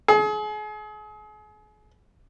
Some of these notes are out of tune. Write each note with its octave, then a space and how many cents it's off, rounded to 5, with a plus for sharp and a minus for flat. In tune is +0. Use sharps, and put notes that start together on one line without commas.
G#4 +35